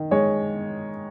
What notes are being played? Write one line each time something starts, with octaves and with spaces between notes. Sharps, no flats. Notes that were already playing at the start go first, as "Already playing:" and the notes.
Already playing: D#3
G#3 C#5